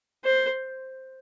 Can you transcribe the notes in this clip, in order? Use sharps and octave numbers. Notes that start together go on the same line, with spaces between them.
C5